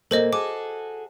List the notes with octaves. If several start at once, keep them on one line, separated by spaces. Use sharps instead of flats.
A#2 A#3 A4 C5 D#5
F#4 G#4 A4 D6